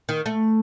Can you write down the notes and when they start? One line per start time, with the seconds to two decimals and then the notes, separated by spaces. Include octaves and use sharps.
0.09 D#3
0.26 A3